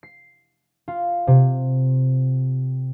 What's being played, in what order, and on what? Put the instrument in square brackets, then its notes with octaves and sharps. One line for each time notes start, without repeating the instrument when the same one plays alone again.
[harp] C7
F4
C3